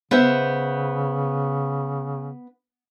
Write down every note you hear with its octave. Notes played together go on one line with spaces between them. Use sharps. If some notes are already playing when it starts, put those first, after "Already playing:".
C#3 B3 C5 E5